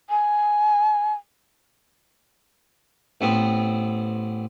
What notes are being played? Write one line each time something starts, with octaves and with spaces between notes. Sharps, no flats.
G#5
A1 B3 C4